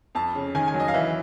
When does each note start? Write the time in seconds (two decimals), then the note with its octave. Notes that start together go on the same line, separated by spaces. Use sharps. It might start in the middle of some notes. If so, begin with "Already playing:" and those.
0.15 F2 A5
0.35 C#3
0.55 D#3 G#5
0.68 G#5
0.74 F#3
0.80 D#5
0.88 F5
0.94 E3 E5